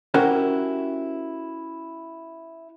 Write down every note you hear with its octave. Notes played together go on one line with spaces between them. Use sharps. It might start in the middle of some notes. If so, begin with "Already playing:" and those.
C#4 E4 F#4 G4 A#4 C5